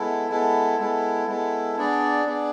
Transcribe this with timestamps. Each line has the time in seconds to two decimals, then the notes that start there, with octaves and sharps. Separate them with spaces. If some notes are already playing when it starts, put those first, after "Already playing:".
Already playing: G#3 B3 E4 A4
0.30 G#3 B3 E4 A4
0.79 G#3 B3 E4 A4
1.27 G#3 B3 E4 A4
1.76 B3 D4 G#4 D5
2.24 B3 D4 G#4 D5